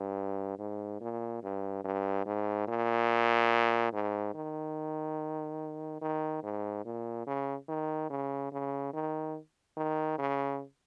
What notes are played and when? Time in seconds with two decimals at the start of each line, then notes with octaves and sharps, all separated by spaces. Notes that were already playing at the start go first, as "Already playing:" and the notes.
Already playing: G2
0.59 G#2
1.01 A#2
1.43 G2
1.84 G2
2.26 G#2
2.68 A#2
3.93 G#2
4.34 D#3
6.01 D#3
6.43 G#2
6.85 A#2
7.27 C#3
7.68 D#3
8.10 C#3
8.52 C#3
8.94 D#3
9.77 D#3
10.19 C#3